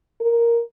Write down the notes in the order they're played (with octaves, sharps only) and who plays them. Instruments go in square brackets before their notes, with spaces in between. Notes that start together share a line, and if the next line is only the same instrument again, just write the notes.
[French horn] A#4